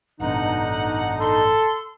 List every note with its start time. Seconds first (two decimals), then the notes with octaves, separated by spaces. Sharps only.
0.20 A1 G2 B2 D3 D#4 F#5
1.20 A4 C6